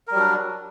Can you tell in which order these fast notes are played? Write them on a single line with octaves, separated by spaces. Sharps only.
A#4 G3 F#3 D4